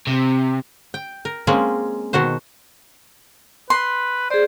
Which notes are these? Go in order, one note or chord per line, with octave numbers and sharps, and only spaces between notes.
C3
G5
A#4
G#3 A#3 C4 C#4 G#4
B2 D#3 F#4 C5
B4 C6
G#4 C5 D5